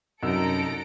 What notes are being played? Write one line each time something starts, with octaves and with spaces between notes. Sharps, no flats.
C2 F#2 D#4 A4 A#5 E6 D7